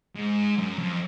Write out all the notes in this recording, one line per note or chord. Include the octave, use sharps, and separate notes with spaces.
G#2
F#2
F2